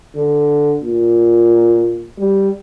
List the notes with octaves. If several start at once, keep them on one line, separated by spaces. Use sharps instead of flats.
D3
A#2
G3